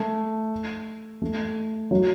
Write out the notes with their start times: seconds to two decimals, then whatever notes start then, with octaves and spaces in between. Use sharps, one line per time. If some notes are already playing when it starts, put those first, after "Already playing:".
Already playing: A3
1.22 A3
1.91 F#3